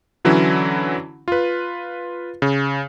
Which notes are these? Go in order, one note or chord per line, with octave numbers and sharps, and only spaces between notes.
D3 E3 F#3 C#4 E4
F4 B4
C#3